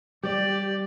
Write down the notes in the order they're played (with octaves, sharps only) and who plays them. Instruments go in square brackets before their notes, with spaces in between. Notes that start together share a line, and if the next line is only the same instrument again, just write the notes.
[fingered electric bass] G3 [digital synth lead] G4 [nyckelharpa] D5